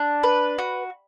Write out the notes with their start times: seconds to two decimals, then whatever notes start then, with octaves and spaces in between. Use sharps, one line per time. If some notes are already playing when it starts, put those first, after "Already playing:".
Already playing: D4
0.23 B4
0.58 F#4